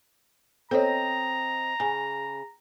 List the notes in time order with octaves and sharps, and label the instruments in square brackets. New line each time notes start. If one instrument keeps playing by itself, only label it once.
[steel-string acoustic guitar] C4 D#5 [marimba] A4 C#5 [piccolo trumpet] A#5
[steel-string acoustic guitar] C#3 [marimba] G#5